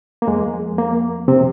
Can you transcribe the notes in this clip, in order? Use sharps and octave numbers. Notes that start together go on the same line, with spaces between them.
A#3
F2 F3 G#3
A#3
C3 C4